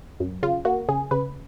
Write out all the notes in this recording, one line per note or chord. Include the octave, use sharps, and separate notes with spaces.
F#2
C#3 F4
A#3 F#4
C#3 G#4
C#3 B4